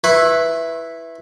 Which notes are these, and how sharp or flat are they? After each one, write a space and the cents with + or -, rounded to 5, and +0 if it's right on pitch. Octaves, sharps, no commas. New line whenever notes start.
E4 +0 B4 +0 C#6 -45